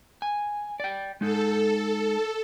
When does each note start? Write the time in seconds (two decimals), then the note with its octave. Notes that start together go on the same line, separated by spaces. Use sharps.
0.22 G#5
0.80 D5 G5
1.21 G#3 D#4 A4